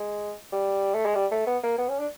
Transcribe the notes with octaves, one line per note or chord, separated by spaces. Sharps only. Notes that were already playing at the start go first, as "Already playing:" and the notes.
Already playing: G#3
G3
A3
G#3
G3
A3
B3
A#3
B3
C#4
D4